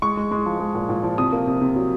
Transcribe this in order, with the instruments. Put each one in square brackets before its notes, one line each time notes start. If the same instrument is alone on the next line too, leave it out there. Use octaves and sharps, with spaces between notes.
[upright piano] G#3 C#6
G#3
G#3
F3
G#3
A#2
A#2
F3
C3 D#6
A#3
C3
C3
F#3